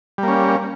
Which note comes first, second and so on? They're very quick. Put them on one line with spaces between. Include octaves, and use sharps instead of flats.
G3 A#3 C#4